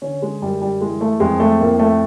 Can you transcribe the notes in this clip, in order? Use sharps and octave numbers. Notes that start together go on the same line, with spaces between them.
D3 C#4
G#3
F#2 G3
G3
E3 G#3
A3
F2 G#3
A3
A2 A#3
A3